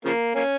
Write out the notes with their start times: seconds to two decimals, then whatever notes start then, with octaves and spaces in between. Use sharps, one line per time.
0.05 C#3 F3 A#3
0.35 A#3 C#4